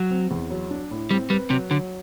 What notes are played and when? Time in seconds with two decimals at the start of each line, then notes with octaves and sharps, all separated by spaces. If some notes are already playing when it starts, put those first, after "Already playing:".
Already playing: F#3
0.11 C4
0.31 E2
0.50 F#3
0.71 D4
0.91 A2
1.11 G3 C4
1.30 G3 B4
1.50 C3 F#3
1.70 D3 F#3